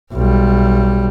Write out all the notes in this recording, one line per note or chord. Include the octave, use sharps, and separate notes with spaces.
B1 G3